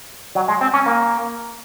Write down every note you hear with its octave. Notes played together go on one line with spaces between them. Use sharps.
F#3
G#3
C4
C#4
A#3